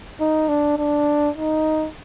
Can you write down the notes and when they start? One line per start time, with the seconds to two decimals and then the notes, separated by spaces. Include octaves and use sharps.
0.20 D#4
0.48 D4
0.78 D4
1.36 D#4